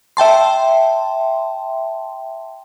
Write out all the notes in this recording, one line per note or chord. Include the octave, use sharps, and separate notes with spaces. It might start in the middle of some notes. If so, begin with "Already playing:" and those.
E5 G5 A5 C6